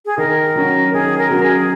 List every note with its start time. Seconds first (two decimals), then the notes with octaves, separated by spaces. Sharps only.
0.06 G#4
0.18 D#3 A#4
0.56 F#3 C#4 F#4
0.93 D#3 G#4
1.18 A#4
1.31 F#3 C#4 F#4
1.43 G#4